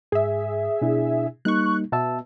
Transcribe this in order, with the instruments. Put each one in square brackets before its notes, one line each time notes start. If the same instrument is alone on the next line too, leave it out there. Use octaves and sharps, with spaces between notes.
[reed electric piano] G#2 [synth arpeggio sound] G#4 E5
[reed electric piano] B2 D4 E4
[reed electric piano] G3 A#3 D#4 [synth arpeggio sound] C#6 F#6
[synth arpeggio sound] B2 [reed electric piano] E5 A5 E6